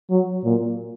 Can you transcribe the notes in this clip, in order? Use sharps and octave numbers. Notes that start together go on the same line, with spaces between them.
F#3
A#2